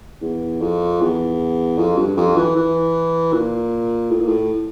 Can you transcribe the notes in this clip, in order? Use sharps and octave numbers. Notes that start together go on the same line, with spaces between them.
E2
F2
E2
F2
G2
F2
E3
E3
A#2
A2
A#2
A2